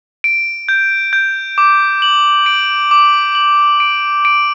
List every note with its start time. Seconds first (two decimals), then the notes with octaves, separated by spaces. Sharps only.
0.24 D7
0.69 G6
1.13 G6
1.58 D6
2.02 F#7
2.46 D7
2.91 D6
3.35 F#7
3.80 D7
4.25 D7